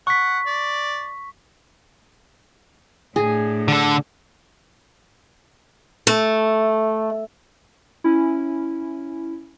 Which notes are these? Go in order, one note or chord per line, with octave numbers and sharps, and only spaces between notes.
F#5 C#6 B6
D5
A2 D4 G#4
D3 A4
A3
C#4 E4